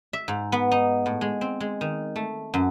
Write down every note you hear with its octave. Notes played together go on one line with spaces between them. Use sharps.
E5
G#2
B3
D#4
A2
G#3
C4
G#3
D#3
A3
F#2